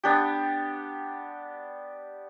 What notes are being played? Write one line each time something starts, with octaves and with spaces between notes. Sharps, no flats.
B3 D4 G4